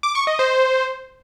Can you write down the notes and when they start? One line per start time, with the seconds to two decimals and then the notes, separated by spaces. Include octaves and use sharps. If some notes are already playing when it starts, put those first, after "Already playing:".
0.03 D6
0.15 C#6
0.27 D#5
0.39 C5